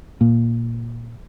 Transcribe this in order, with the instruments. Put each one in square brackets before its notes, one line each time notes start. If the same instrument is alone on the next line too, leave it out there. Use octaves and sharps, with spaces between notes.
[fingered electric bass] A#2